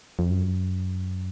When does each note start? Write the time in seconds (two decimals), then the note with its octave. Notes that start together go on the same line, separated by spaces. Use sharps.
0.19 F2
0.30 F#2